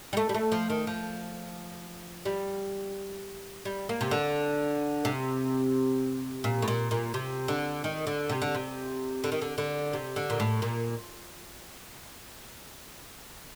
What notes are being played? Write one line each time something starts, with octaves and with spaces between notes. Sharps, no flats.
G3
A3
G3
A3
F3
D#3
F3
G3
G3
A#3
C3
D3
C3
A#2
A2
A#2
A#2
C3
D3
D#3
D3
C3
D3
C3
D3
D#3
D3
D3
C3
D3
A#2
A2
A#2